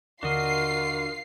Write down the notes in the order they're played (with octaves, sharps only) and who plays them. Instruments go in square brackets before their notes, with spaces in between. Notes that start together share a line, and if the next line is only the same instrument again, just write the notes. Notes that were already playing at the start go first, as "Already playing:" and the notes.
[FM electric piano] D#2 D3 [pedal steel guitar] D4 F#4 D#5 [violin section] F4 C7 [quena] A#4